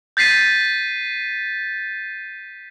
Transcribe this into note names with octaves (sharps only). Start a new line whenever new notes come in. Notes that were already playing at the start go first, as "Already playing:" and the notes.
G6 A6 B6 C7 D#7